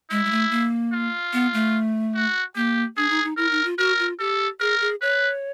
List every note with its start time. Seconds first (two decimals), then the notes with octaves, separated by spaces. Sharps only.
0.10 G#3 E4
0.25 G#3
0.31 A3
0.51 A#3
0.93 F4
1.33 B3
1.54 A3
2.15 F#4
2.56 A#3 G4
2.97 D4 G#4
3.10 D#4
3.24 D#4
3.37 E4 A#4
3.51 D#4
3.65 F4
3.78 F#4 A#4
3.99 F4
4.19 G4 A4
4.60 G#4 A#4
4.81 G#4
5.01 B4 C#5